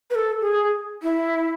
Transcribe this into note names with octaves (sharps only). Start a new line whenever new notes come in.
B4
A4
G#4
E4